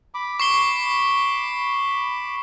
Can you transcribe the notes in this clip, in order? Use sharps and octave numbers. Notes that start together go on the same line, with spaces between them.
B5 D6
C#6 C7 G7